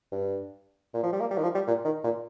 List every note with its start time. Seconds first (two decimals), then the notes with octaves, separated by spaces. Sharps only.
0.12 G2
0.94 A#2
1.03 F3
1.13 G3
1.21 A#3
1.31 G3
1.38 D#3
1.43 F3
1.55 G3
1.67 A#2
1.85 D#3
2.04 A#2